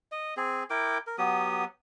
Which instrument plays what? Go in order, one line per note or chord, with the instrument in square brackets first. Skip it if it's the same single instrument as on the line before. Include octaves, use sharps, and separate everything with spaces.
[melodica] D#5
C4 G#4
E4 A#4 G5 D6
A#4
F#3 B3 G4 D#6